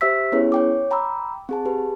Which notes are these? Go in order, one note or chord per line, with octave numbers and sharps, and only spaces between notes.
G4 C5 E5 E6 B6
B3 C#4 E4 G#4 B4 C#5
C#5 G5 D6
G5 A#5 B5 D6 E6
C4 G#4 A5
G4 G#4 B4